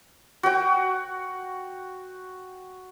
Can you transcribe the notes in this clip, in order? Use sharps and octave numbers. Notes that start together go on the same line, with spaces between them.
F#4 G5